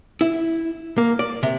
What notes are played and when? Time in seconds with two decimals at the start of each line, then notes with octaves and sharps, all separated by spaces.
0.21 E4
0.98 A#3
1.19 D5
1.43 C3